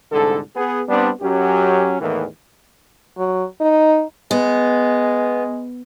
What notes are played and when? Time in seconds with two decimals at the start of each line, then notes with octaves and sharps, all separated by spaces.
0.12 C2 G#2 D3 A4
0.56 B3 G#4
0.89 G3 B3 C4 D4
1.21 F#2 F#3 C#4 G4
2.00 E2 A2 D#3 E3 A#3
3.17 F#3
3.61 D#4
4.31 G#3 B3